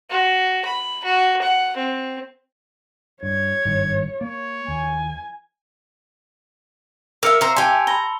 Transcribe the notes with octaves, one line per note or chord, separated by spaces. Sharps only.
F#4
B5
F#4
F#5
C4
G2 C#5 G#6
G#1 G2 D#3
A#3 C#5
D#2 G#5
A#4 E5 F5 D6 E6 C#7
C5 A#5
G4 G#5 A5 C6 F7
A#5 B5 G7